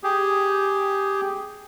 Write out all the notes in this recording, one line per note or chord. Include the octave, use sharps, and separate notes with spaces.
G4 G#4